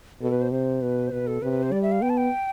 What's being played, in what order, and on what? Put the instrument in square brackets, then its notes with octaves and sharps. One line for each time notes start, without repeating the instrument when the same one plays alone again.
[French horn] B2 [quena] A4
[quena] B4
C5
[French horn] C3 [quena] C5
[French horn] B2 [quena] B4
[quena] C5
[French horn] B2 [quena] B4
[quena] A4
[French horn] C3 [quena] B4
[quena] C5
[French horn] G3 [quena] D5
[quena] E5
F5
[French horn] B3 [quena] G5
[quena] A5
G5